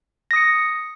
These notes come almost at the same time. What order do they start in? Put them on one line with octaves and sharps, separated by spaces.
A#6 D#6 C#7